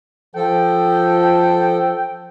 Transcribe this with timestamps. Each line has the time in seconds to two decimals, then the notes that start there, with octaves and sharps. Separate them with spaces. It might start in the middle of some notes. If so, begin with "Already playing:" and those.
0.35 F3 A4 G5